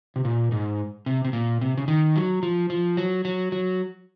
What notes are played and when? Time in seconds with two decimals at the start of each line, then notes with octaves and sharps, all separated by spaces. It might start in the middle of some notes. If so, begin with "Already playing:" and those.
0.16 C3
0.25 A#2
0.52 G#2
1.06 C3
1.25 C3
1.33 A#2
1.61 C3
1.78 C#3
1.88 D#3
2.16 F#3
2.43 F3
2.70 F3
2.97 F#3
3.25 F#3
3.52 F#3